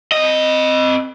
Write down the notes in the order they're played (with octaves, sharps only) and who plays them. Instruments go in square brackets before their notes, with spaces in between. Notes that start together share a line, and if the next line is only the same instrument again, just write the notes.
[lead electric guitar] C4 D#5